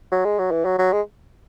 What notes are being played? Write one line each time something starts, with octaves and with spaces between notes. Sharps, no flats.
F#3
G#3
F#3
E3
F#3
F#3
G#3